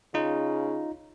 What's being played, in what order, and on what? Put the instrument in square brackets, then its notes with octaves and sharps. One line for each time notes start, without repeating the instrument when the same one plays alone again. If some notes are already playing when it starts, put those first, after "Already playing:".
[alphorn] C#3 [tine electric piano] D#4 F4